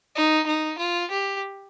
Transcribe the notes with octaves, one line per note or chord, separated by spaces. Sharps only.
D#4
D#4
F4
G4